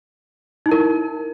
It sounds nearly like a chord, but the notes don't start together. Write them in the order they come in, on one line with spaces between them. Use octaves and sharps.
D#4 E4 A#4